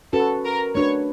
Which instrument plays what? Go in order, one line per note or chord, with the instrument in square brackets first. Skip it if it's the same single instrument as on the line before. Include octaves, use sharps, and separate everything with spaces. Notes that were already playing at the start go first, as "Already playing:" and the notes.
[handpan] C#4 F#4 B4 [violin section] A4
[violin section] A#4
[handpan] A3 D4 F#4 B4 [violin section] C#5